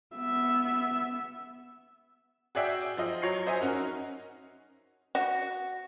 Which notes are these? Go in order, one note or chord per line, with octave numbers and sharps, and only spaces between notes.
B3 E5
F#4 G#4 D5 E5 G5
F3 F4 D#5
F#3 C#5 C7
C5 D#5 E5 G#5
C#4 D#4 F#4 A#4
F#4